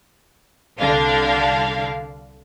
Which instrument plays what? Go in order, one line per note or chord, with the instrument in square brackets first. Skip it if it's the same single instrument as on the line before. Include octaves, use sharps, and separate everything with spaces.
[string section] C2 D3 D4 F5